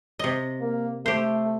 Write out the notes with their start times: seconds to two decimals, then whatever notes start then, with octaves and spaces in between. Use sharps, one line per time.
0.19 C3 D#5
0.61 A#3
1.06 A3 G4 C5